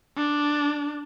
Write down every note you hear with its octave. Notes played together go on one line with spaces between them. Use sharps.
D4